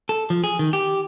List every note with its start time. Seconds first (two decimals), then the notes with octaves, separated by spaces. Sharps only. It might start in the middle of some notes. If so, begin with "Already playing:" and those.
0.09 A4
0.30 F3
0.44 G#4
0.59 D#3
0.73 G4